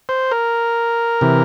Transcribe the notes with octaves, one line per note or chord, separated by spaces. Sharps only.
C5
A#4
C3 E3